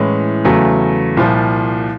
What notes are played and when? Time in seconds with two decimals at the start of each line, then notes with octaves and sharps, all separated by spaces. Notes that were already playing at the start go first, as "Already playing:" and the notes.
Already playing: A2 E3 G#3 C#4
0.45 E2 C#3 F#3 A3
1.17 C2 A#2 F3